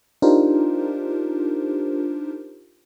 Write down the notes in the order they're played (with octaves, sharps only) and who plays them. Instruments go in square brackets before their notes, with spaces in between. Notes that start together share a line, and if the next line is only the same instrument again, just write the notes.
[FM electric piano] D4 D#4 F4 G4 A#4 C5